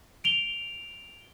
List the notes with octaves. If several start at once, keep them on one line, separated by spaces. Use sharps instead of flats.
D7 F7 G7